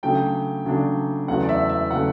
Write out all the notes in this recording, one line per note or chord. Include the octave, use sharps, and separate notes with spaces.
C#3 F#3 A3 D4 G5
C#3 F#3 A3 D4
E2 C#3 F#3 A3 F#5
D5
E5
E5
C#3 F#3 A3 F#5